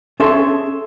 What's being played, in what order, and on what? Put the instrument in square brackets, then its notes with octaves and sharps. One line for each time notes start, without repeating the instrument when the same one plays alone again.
[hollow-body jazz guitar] C#4 G#4 A4 E5 A5 C6